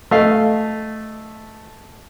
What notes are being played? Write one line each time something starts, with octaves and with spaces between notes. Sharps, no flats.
A3 D#5 F5